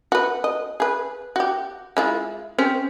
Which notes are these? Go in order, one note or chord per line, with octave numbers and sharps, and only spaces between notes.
F#4 B4
D#5
G#4 B4
F#4 G4
G#3 E4 F4
C4 C#4 G4